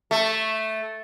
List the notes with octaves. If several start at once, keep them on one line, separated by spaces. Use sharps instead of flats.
A3